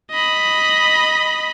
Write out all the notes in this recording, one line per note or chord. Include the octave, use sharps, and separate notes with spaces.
D#5 B5